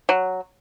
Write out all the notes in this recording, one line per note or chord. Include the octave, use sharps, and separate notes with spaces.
F#3